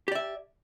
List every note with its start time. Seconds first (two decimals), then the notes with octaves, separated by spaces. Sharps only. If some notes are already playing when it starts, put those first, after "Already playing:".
0.08 G4
0.12 D5
0.15 E5